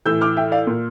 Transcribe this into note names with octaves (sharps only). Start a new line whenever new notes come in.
A2 E3 E6 G6
D6 F6
E5 G5
D5 F5
A#2